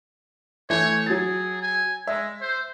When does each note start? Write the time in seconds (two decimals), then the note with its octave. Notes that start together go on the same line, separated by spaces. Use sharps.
0.70 E3 A3 C#5
1.06 F#3 G#4 A6
1.62 G#5
2.07 G#3 E5
2.41 C5